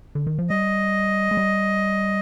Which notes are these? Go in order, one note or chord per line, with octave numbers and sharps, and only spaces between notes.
D3
D#3
F3
G3 D#5
G#3
G3